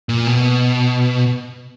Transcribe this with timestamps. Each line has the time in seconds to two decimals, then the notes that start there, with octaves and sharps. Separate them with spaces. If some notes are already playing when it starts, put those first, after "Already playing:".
0.09 A#2
0.27 B2